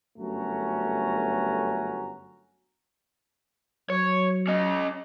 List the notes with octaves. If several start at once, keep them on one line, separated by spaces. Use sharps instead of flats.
G1 F#2 A3 C#4 F#4 A#5
F#3 C#5
C#4 D#5